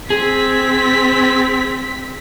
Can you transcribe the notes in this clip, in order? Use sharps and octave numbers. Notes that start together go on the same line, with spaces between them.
C4 G#4 B6